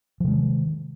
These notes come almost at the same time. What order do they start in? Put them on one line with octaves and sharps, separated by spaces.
F3 C3 G#3 D#3